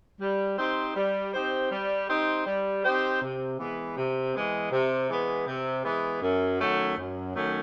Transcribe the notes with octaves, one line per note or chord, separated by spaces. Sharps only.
G3
C4 D#4 G4 C5
G3
C4 D#4 G4 C5
G3
C4 D#4 G4 C5
G3
C4 D#4 G4 C5
C3
E3 G#3 B3
C3
E3 G#3 B3
C3
E3 G#3 B3
C3
E3 G#3 B3
F#2
D#3 F#3 A3 C#4
F#2
D#3 F#3 A3 C#4